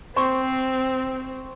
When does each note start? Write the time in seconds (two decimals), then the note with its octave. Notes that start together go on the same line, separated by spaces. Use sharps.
0.16 C4 C5 C6 C#6